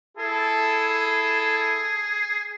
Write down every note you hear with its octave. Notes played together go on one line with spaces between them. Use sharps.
E4 G#4 A4